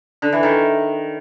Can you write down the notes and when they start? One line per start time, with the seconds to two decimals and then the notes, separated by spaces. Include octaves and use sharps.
0.22 D3
0.33 E3
0.43 D#3